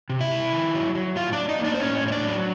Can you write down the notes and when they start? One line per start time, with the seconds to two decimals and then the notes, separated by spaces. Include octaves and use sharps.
0.10 C3
0.20 E4 E5
0.31 C3
0.53 D#3
0.74 F#3
0.95 F#3
1.16 A2 F4 F5
1.33 A2 D4 D5
1.49 D#4 D#5
1.59 A#3
1.64 D4 D5
1.75 C5
1.80 A2 C#4 C#5
2.01 A2
2.08 C#5
2.12 D4 D5
2.23 F#3